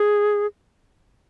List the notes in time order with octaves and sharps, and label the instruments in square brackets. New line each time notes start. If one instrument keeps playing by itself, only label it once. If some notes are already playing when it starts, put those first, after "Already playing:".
Already playing: [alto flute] G#4